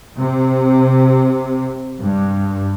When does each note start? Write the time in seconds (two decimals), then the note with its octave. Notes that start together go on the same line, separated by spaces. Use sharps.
0.18 C3
2.01 G2